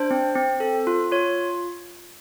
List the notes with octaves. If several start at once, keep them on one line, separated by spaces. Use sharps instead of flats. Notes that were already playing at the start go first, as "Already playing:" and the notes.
Already playing: D4 C5
C4
C4
A4
F4
F4 C#5